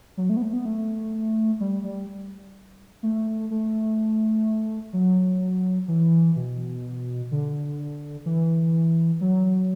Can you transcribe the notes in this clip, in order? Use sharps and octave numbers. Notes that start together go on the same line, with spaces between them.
F#3
A3
B3
A3
B3
A3
G3
G3
A3
A3
F#3
E3
B2
D3
E3
F#3